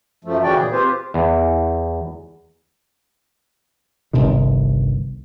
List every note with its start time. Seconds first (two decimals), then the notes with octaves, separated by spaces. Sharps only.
0.24 F#2 F3 A3
0.43 C#3 E3 C#4 F#4 D5 G5
0.57 D#2 A#2 G#4
0.72 C4 F4 G4 B4 C5
1.14 E2
4.13 G1 C2 C3 D#3